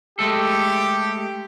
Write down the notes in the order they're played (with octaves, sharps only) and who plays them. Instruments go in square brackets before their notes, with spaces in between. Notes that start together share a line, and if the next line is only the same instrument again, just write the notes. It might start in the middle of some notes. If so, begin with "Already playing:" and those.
[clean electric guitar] G#3 A3 A4 [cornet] G4